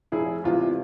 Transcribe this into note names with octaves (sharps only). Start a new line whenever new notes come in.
F1 E4 G#4
E2 C3 E3 G#3 F4